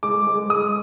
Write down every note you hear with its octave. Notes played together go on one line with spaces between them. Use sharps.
G#3 D6
G#3
G#3 D#6